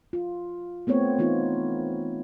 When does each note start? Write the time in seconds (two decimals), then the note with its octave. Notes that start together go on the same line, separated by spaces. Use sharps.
0.13 F4
0.87 A3 B3 C4 C#5
1.18 E3 B3 C4 D#4 F4